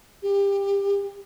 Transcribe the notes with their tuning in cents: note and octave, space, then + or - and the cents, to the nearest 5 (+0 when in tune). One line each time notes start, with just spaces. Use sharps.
G4 +25